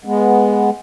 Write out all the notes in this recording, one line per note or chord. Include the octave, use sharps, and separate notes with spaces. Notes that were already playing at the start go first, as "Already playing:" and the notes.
G#3 B3